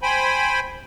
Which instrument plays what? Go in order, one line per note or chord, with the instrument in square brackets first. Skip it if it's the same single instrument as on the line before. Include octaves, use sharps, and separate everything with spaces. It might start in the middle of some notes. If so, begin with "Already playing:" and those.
[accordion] C5 G5 G#5 B5